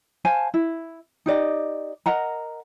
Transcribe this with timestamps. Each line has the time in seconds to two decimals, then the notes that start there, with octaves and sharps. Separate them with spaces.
0.25 C5 F5 G#5 A5
0.54 E4
1.26 D#4 G4 D5 D#5
2.06 A#4 D#5 F#5 A#5